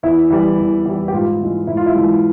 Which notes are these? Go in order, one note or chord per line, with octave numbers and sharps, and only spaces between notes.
E2 E4
E3 G3
E2
E3 G3
G4
G#2 F4
E3 G#3
G#2 E4
F4
E4
E3 G#3